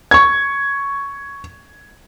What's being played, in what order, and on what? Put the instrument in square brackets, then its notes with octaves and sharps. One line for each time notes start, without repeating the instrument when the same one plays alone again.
[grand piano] C#6 G#6